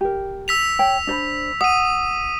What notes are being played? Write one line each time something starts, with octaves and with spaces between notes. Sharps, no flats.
G4 A#4
E6 B6 F7
C#5 G5 A5
D4 C5 B5
F#5 D#6 D#7